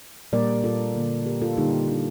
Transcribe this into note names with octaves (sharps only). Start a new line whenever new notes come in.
A#2 G3 A#3 A#4 D5
F4 A4
D3 G3 A#3
G4 A#4
F4 A4
D3 G3 A#3 D#4 G4
D4 F4